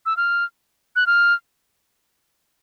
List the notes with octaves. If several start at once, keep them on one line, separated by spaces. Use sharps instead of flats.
E6
F6
F#6
F6